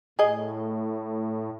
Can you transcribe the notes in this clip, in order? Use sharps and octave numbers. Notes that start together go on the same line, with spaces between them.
A2 G#4 D#5